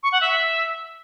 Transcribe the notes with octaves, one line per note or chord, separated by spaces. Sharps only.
C#6
F#5
E5